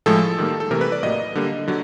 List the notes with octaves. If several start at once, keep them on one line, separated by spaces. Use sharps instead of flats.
A2 F3 G#3 A4
D#3 G3 A#3
A4
C3 E3 A3 A#4
B4
D5
A2 F#3 A#3 D#5
D3 G3 A#3
D3 F#3